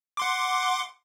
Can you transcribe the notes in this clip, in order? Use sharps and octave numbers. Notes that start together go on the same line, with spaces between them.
F#5 C6 D6